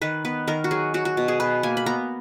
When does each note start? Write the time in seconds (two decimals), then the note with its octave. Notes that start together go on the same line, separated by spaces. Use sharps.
0.02 D#3 B4
0.25 B3 B4
0.47 D#3 A#4
0.64 F#4
0.71 F#3 G#4
0.94 F#3 F#4
1.05 F#4
1.17 B2
1.28 G#4
1.40 B2 B4
1.63 A#3 G#5
1.77 B5
1.86 B3 A#5